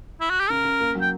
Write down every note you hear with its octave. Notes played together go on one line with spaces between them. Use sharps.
E4
F#4
G4
C#3 A#4
C#3
A#3
F#3
G5